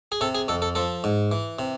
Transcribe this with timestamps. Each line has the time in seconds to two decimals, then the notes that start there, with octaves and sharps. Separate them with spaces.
0.12 G#4
0.21 C3 A4
0.35 G#4
0.48 F2 A4
0.62 A4
0.75 F3 A4
1.04 G#2
1.32 E3
1.59 C3